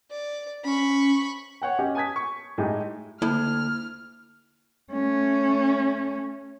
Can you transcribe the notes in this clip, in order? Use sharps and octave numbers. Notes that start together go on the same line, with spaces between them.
D5
C#4 B5 C#6
C#5 F#5 G5
C#4 G4 D#5
G#5 A5 D#6 G#6 B6
C#6
A2 G#3 D#4 G4
D2 A#3 E4 F6
A3 C#4